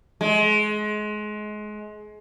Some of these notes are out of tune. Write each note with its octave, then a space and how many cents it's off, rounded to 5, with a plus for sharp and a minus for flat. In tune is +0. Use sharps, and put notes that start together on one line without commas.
G#3 +25